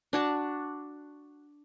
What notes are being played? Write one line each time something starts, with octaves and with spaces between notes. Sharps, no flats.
D4 F#4 A5